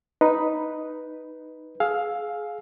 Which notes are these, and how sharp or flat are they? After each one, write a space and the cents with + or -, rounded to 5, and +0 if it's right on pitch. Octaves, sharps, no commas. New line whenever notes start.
D#4 +0 B4 +0
G#4 +20 F5 +10 E6 +0